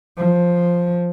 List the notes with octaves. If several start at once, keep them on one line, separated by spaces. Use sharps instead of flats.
F3